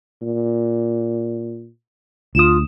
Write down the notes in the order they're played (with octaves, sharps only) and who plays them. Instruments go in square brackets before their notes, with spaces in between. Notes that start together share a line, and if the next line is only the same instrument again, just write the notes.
[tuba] A#2
[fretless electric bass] D2 [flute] F4 [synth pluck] D#6 E7